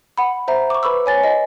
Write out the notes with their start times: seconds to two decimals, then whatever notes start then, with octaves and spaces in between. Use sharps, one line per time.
0.17 F#5 B5
0.48 C5 E5 A#5
0.70 C#6 D6
0.83 B4 B5 C#6 E6
1.06 C#5 G#5 A6
1.24 D#5